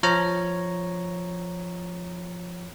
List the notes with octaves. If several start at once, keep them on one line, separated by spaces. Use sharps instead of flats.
F3 C#5 A#5